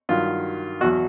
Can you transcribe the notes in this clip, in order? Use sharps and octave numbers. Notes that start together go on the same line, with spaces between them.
G2 D#3 F#3 F4
E2 B2 F#3 F#4